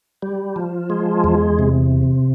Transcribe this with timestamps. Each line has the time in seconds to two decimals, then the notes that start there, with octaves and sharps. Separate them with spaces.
0.23 G3
0.56 F3
0.90 G#3
1.24 E2
1.59 C3